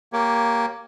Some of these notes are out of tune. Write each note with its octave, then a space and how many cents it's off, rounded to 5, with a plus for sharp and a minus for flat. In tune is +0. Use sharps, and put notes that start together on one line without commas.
A#3 +0 G4 +0 C#5 +5